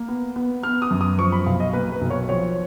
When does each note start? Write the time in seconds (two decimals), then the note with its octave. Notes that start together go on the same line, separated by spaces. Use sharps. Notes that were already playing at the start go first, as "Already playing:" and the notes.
Already playing: A#3
0.08 B3
0.36 B3
0.63 B3 F6
0.82 D#6
0.91 F#2
1.01 D#6
1.18 F3 C#6
1.32 B5
1.46 B1 F5
1.60 D#5
1.73 A#3 B4
1.92 B4
2.01 B1
2.10 C#5
2.29 F3 C#5